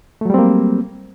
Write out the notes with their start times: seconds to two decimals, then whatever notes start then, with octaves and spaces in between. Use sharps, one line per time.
0.21 A3
0.26 F#3
0.30 G3
0.34 C4
0.38 A#3